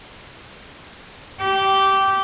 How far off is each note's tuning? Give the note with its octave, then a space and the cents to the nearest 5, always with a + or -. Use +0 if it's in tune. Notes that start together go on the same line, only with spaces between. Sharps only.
G4 -15